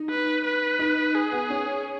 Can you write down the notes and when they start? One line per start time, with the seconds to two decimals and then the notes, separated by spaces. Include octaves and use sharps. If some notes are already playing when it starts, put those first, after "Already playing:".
Already playing: D#4
0.10 B4
0.45 B4
0.79 D#4
1.15 G#4
1.32 B3
1.50 C#4